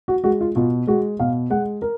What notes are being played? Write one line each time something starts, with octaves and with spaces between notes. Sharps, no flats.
F#4
G#3 F#4
F4
B2 F4
G#3 F#4
B2 F5
G#3 F#5
A#4